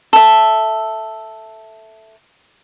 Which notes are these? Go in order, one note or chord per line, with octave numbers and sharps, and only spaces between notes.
A4 E5